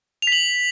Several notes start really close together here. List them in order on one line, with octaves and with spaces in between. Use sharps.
F7 B6 F#7